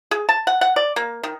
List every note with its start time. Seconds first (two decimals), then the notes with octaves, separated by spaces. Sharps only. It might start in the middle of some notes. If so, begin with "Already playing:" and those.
0.11 G#4
0.29 A5
0.47 F#5
0.61 F#5
0.76 D5
0.96 A#3
1.23 D#3